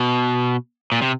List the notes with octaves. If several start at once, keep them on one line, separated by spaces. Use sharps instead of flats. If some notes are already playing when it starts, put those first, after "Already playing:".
Already playing: B2
A#2
C3